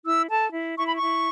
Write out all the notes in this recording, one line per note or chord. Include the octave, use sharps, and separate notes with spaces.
E4 E6
A4 A5
E4
E4 C#6
B5
C#6
E4